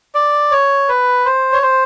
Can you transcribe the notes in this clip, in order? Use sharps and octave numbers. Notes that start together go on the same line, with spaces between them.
D5
C#5
B4
C5
C#5
C5